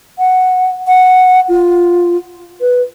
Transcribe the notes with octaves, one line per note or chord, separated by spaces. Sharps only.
F#5
F#5
F4
B4